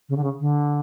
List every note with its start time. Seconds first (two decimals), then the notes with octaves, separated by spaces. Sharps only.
0.09 C#3
0.17 D3
0.24 C#3
0.40 D3